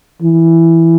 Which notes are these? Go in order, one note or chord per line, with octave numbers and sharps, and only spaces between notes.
E3